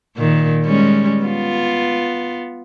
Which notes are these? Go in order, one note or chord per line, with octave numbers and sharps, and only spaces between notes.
A#2 D#3
G3 G#3 C#4
B3 F4